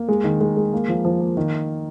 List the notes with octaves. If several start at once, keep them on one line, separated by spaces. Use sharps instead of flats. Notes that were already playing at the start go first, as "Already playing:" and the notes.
Already playing: A#3
G#3
D#3
G#3
G#3
A#3
F3
F3
A#3
D#3